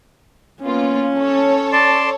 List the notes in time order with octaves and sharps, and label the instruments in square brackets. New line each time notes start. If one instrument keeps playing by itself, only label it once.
[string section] A#3 B3 F4 [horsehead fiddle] C#4
[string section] A4 C#5
[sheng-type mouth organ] D5 A5 C6